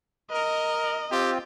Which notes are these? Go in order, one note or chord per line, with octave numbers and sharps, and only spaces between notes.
A#4 D#5
C4 F4 G4